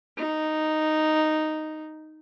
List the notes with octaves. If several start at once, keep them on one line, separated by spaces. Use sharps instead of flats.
D#4